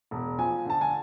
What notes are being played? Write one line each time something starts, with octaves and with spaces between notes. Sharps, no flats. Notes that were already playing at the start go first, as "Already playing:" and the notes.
E1
F3 G#5
D3 A5
G#5